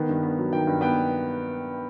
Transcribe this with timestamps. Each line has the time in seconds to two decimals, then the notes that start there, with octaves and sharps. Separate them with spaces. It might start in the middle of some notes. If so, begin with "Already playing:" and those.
Already playing: D#3 B3
0.09 G2
0.23 B3
0.38 F#3
0.53 D#3 G5
0.67 G2
0.81 B3 G5